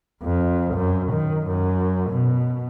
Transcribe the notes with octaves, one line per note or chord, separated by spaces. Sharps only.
F2
F#2
D#3
F#2
B2